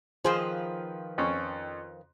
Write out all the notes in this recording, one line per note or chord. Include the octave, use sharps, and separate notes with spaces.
D#3 F3 F4 G#4 B4 C5
F2 C#4